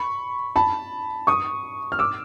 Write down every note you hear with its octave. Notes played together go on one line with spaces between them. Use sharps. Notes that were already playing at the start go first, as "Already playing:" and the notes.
Already playing: B5 C#6
A5 B5
C#6 D#6
F6
D6 E6